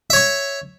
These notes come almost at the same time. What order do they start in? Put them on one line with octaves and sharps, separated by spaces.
E5 C#5 C#6